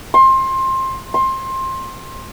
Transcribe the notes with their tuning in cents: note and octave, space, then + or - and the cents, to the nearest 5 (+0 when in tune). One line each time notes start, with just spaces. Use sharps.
C6 +20
C6 +20